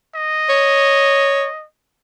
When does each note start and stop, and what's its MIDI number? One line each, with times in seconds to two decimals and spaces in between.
0.15 1.65 75
0.49 1.47 73